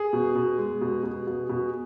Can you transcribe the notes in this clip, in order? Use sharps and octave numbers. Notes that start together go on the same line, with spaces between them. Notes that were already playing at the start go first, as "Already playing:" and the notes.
Already playing: G#4
B2
B2
G#3
B2
B2
B2
B2